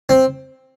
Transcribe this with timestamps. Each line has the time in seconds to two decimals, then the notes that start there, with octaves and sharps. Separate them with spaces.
0.09 C4